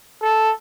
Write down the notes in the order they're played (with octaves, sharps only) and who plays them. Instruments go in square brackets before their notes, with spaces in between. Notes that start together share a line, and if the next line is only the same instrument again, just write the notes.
[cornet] A4